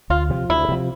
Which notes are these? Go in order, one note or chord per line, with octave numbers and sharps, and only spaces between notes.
D2 F4
C3 F3
D2 E4
C3 F3